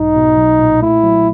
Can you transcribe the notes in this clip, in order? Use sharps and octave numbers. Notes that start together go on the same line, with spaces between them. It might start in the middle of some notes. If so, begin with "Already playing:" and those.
Already playing: B1 G#2 D#4
B2
B1
A#2
A3 E4
F#3